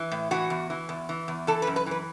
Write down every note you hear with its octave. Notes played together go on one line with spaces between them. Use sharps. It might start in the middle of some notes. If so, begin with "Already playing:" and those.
Already playing: E3
A2
E3 F#4
E2
E3
E2
E3
E2
E3 A4
B4
F#2
B4
E3 B4